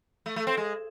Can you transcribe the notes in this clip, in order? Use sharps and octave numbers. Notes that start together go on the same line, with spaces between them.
A3
A3
C4
G#3